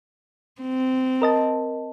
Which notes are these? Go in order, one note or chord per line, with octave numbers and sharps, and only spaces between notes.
C4
A#4 D#5 A5